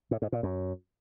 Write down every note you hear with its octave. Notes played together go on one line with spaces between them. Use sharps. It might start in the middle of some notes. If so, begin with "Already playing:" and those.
A2
G#2
A#2
F#2